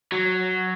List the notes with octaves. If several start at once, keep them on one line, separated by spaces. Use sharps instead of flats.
F#3